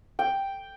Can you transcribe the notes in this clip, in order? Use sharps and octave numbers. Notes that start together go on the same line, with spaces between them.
G5